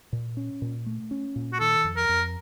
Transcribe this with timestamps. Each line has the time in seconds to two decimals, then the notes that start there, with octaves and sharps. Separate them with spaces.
0.13 A#2
0.37 C#4
0.62 A#2
0.86 A3
1.11 C#4
1.36 A#2
1.53 F#4
1.60 D#3 A4
1.84 F2
1.97 A#4
2.09 F2